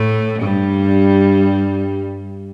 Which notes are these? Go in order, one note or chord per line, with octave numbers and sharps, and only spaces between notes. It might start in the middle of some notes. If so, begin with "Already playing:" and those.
Already playing: A2 A3
G2 G3